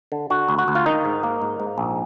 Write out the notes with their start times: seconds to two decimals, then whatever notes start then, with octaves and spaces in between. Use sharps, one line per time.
0.12 D3
0.30 D3 F#4
0.49 D2
0.58 F#4
0.68 D2
0.75 F4
0.86 D#3 D#4
1.05 G#2
1.23 A#3
1.42 G#2
1.60 G#2
1.78 A#1